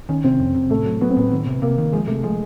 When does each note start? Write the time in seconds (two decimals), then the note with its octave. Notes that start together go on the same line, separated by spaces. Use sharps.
0.09 D#3 C#4
0.24 C3 C4
0.39 F2
0.55 C3
0.70 A2 A3
0.86 F#3
1.01 F#3 B3
1.10 C4
1.17 A2 B3
1.31 D#3
1.47 C3
1.62 C3 A#3
1.78 D#3
1.92 F3 G#3
2.08 C3 A3
2.23 F3 G#3